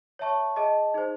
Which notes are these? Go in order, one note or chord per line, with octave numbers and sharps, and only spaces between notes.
C#5 E5 A5 C#6
G#4 D#5 A5
D#4 G#4 C5